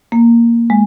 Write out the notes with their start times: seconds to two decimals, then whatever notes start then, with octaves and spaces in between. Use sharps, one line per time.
0.12 A#3
0.70 G#3